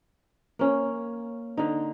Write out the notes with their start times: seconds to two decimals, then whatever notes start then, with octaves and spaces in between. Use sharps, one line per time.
0.59 A#3 C#4
1.57 D3 D#4